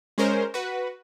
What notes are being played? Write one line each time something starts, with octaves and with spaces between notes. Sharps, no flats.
G#3 C#4 A#4 C5
F#4 B4